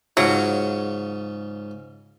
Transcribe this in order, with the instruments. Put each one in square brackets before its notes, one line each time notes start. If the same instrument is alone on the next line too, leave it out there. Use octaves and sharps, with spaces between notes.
[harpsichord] G#2 C#3 F4 [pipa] F#3